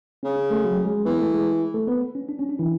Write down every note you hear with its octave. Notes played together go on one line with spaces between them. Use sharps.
C#3 C#4
C#4
A3 A4
F#3 F#4
G#3 G#4
E3 B3 B4
A3 A4
G#3 G#4
A3 A4
B3 B4
C#4
D4
C#4
D4
E3 E4